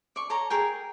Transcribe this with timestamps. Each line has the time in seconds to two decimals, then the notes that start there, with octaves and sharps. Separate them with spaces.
0.16 D5 C#6
0.30 A4 C#5 A#5
0.50 G#4 A#4 G5